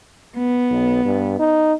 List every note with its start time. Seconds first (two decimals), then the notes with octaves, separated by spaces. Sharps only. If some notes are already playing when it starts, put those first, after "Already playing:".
0.37 B3
0.71 B1
1.05 G2
1.39 D#4